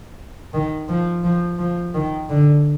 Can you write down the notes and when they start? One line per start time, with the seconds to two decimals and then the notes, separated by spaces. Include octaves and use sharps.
0.54 D#3
0.89 F3
1.24 F3
1.59 F3
1.94 D#3
2.29 D3